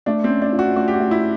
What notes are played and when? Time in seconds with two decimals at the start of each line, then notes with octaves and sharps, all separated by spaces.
0.06 A3 D4
0.24 C4
0.29 C#4
0.42 D4
0.53 F4
0.59 F#4
0.76 A3 F#4
0.88 G4
0.94 F#4
1.00 A3
1.11 E4